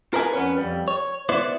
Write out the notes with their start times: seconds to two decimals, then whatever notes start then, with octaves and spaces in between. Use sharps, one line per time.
0.13 F4 A#4 B4 D#5 G#5
0.33 F2 B3 C#4 B4 C#5
0.57 F2 G3
0.88 C#5
1.29 B3 E4 C5 D5